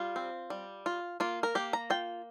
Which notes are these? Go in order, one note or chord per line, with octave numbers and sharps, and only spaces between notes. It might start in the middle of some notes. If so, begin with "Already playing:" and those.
Already playing: G3 F4
C4
G3
F4
A#3 F4
A#4
A#3 G4
A#5
F4 G5